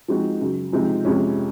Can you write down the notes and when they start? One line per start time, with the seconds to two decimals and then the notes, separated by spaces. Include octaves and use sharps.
0.08 F3 G#3 C4 D#4 F#4
0.41 F#2 C#3 F#3
0.72 C3 F3 G#3 C4 D#4
1.05 F2 C3 F3 G#3 C#4